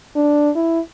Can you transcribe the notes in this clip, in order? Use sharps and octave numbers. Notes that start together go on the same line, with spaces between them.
D4
E4